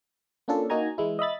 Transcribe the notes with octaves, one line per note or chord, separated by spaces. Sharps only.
A#3 C#4 D4 F4 A4
A#3 D#4 F#4 G#5 A#5 G#6
E3 G#3 E4
D#5 E5 B5 A6